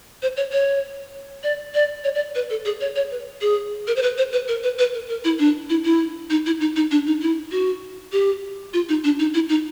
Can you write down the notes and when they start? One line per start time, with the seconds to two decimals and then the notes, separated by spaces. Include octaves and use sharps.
0.22 C5
0.37 C#5
0.52 C#5
1.43 D5
1.74 D5
2.04 C#5
2.15 D5
2.35 B4
2.50 A4
2.65 G#4
2.81 C#5
2.96 C#5
3.11 B4
3.41 G#4
3.87 A#4
3.96 C5
4.02 B4
4.18 C5
4.32 B4
4.48 A#4
4.63 B4
4.79 B4
4.94 A#4
5.09 A#4
5.24 E4
5.39 D4
5.70 E4
5.85 E4
6.30 D#4
6.46 E4
6.61 D#4
6.76 D#4
6.91 D4
7.07 D#4
7.22 E4
7.52 F#4
8.12 G4
8.73 F4
8.89 D#4
9.04 D4
9.19 D#4
9.34 E4
9.49 D#4